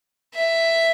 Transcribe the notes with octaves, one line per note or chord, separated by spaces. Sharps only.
E5